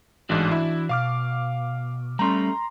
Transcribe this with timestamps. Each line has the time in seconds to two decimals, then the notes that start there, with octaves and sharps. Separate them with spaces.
0.29 A1 G#2 E3 D4 F#4
0.51 E4
0.89 B2 F5 D6 F6
2.19 G3 A3 C#4 A#5 C6